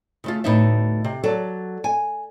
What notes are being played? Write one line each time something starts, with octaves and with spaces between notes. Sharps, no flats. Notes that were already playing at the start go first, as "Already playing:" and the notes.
C#3 A3 F4
D2 A2 B3 D#4 D#5 E5
C3
F#3 A4 D5
G#5